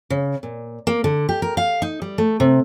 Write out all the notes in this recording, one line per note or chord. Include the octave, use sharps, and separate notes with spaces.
C#3
A#2
A#3
D3
G4
A#4
F5
D#4
G3
A3
C3